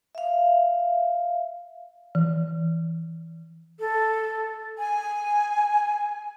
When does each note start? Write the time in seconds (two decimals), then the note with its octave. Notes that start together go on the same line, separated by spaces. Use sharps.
0.15 E5 F5
2.15 E3
3.80 A4
4.78 G#5